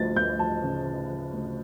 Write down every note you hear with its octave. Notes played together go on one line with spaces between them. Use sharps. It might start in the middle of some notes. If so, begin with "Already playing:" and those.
Already playing: D2 F3 A6
D2 G6
F3 A5
C#3
F3
F3
D2